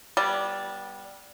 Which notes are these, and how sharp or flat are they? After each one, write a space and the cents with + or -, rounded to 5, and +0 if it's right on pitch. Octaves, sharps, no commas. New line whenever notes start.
G3 -5 B3 -30 D5 +0